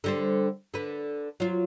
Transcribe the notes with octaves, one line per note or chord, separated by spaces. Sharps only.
D3 G3 C5
D3 B4
F#3 F4